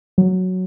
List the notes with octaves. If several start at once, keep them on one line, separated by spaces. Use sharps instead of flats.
F#3